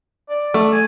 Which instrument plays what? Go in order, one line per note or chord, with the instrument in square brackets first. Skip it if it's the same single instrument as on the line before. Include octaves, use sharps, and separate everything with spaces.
[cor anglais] D5
[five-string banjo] A3
[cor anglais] G#5